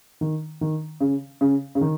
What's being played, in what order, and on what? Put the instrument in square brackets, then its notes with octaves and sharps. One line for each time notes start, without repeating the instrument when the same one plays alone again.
[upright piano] D#3
D#3
C#3
C#3
C#3
D#3